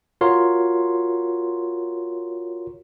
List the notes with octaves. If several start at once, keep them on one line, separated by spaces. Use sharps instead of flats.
F4 F#4 A#4 C#5 C6